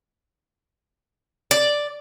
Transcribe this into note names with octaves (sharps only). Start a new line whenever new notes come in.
D5